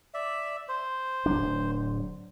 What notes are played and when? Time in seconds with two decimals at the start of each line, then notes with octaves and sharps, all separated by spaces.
0.14 D5 E5
0.68 C5
1.26 D1 F#3 D4